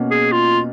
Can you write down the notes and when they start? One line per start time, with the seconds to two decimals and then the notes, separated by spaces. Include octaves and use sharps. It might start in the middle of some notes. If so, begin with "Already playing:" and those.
Already playing: B2 A#3 C#4
0.11 G#4
0.32 F4